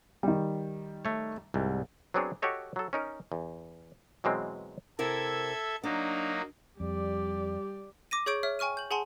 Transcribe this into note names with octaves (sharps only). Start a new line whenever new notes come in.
D#3 G3
A3 C#5
C2 G#2
F#3 B3 C4 D4 G#4 C#5
F#4 G4 A4 C#5 D#5
F#3 A4
C#4 D#4 A#4
E2
B2 E3 F#3 G#3 C4
C3 E4 A4 A#4 E5 G#6
F#3 A#3 D4 D#4
F2 G3 G4 D5
D6 A#6 D#7
G#4 C#5 C#6 G6 D7
C#5 E5 F6
G5 G#5 C#6 F6 D#7
G6 F#7
G#4 F#5 G#5 A5 C6